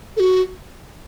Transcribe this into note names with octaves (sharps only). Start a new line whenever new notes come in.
A4
F#4